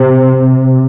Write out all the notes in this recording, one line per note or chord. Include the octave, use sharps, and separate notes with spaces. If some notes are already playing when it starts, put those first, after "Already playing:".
Already playing: C3